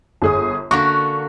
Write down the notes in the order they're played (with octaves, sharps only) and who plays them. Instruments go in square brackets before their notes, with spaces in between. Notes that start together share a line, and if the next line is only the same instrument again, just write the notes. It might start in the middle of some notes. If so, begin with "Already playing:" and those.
[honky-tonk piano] G1 G#4 D#6
[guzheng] D3 A#3 F#4 [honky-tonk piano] C#6